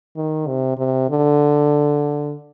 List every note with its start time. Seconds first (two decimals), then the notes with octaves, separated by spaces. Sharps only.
0.16 D#3
0.47 C3
0.77 C3
1.09 D3